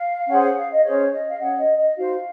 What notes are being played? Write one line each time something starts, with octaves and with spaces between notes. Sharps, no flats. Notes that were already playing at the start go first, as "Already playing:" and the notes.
Already playing: F5
C#4 G#4 C5 F#5
F#5
F5
D#5
C#4 G#4 C5 C#5
D#5
F5
C#4 G#4 C#5 F#5
D#5
D#5
D#4 F#4 C5 F5